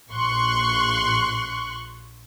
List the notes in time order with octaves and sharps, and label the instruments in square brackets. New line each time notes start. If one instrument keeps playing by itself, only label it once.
[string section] A#1 C6 C#6 F#6